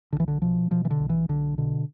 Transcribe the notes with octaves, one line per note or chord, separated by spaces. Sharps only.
B1 D3
E3
D3
B2 F3
B2 F3
E3
D3
B1
E3
B1 D3
B2 D3